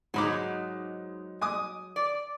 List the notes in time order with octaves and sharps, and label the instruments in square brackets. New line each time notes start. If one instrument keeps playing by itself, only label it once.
[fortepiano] G#2 B5 D6 [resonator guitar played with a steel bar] F#3 G#3 D#4
[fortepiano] G#5 D6 D#6
[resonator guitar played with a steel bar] D5